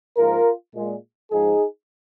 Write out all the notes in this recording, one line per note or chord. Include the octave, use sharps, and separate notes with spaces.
G#2 F3 A#3 F4 A#4
A#2 G#3
G#2 F3 G#3 D#4 G#4